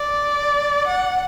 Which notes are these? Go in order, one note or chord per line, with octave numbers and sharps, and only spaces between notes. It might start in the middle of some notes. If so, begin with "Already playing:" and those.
Already playing: D5
F#5